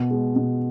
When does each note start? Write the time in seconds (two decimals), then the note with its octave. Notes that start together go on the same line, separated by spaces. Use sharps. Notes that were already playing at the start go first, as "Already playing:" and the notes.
Already playing: B2
0.11 G#3
0.36 B2